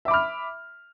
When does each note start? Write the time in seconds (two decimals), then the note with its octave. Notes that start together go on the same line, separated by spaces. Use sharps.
0.05 E5
0.08 D6
0.11 B5
0.14 F6